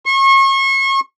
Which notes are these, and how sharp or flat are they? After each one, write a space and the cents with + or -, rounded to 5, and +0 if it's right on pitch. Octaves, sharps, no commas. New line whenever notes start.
C#6 -35